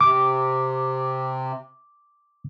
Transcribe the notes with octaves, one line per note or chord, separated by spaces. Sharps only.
C3 D6